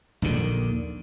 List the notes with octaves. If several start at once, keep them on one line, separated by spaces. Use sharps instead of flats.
A#1 D#2 D3 D#3